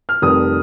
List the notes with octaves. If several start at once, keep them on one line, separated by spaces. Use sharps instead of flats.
F6
F1 F2 D#3 G3 D#6